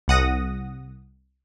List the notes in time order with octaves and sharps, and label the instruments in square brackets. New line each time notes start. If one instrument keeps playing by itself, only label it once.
[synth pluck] C2 F#5 D#6 A#6